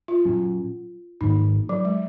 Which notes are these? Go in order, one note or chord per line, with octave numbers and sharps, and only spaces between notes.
F4
A#2 F#3 C#4
G#2 D#3 A#3 D#4
F#3
G#3